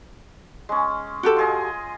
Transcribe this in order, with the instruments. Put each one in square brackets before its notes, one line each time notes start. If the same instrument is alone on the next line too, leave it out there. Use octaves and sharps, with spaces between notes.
[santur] G#3 C#4
[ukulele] F#4 G4 A4
[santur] F4 G#4 D#5